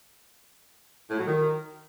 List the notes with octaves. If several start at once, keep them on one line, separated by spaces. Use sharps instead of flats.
A2
F#3
D#3